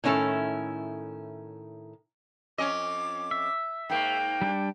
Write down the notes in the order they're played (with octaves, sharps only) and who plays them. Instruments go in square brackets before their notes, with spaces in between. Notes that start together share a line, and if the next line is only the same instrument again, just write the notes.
[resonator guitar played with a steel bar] A2 D#3 C#4 E4 A4
[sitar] F2 C#4 D#5 [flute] D6
[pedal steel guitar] E5
[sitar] G#2 A#3 [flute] G5
[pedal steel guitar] G3 D4